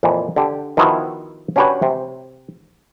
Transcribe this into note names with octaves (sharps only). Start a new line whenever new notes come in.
F2 A#2 E3
D3 G4
D#3 F3 B3 E4 F#4
C#4 D4 F#4 G4 B4 C#5
C3